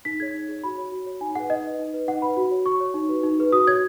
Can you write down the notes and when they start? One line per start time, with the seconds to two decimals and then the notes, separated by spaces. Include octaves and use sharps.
0.05 D#4 B6
0.20 G#4 C#5 G#6
0.34 D#4
0.49 G#4 C#5
0.64 F#4 B5
0.78 C#5
0.92 F#4
1.06 C#5
1.21 D#4 G#5
1.35 G#4 B4 F#5
1.50 D#4 D#5
1.65 B4
1.79 D#4
1.94 B4
2.08 D#4 F#5
2.22 B4 B5
2.37 F#4
2.51 C#5
2.66 F#4 C#6
2.80 C#5
2.94 D#4
3.09 F#4 B4
3.23 D#4
3.39 G#4 B4
3.52 F#4 D#6
3.67 C#5 G#6